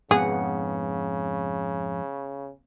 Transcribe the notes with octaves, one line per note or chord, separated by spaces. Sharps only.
F2 G#2 C#3 B3 G#4 F#5